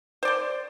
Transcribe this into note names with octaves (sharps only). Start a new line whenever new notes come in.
C5 D5 C6